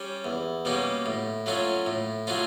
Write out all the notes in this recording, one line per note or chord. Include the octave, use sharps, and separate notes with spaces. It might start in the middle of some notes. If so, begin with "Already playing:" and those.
Already playing: G3 C#4
E2
B2 G3 A#3 C#4
A2
F#3 A3 C#4 F4
A2
F#3 A3 C#4 F4